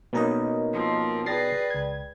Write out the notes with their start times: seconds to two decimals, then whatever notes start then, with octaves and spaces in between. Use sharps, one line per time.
0.13 B2 A#3 C#4 D#4 A#4 D#5
0.72 F3 C4
1.26 G#4 B4 D5 G5 A6 A#6 C7
1.70 C#2 G#6